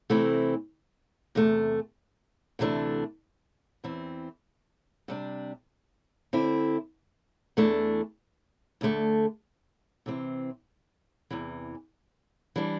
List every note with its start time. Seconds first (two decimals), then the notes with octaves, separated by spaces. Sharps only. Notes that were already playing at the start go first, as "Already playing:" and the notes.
0.10 C3 E3 A3 C4 E4
1.35 E2 C3 A3
2.59 D2 C3 E3 A3 D4
3.84 E2 E3 C4
5.08 C3 G3 D4
6.33 D3 C4 E4
7.57 E2 E3 A3 D4
8.81 D2 D3 A3
10.06 C3 E3 C4
11.30 E2 C3 E3
12.56 E3 G3 D4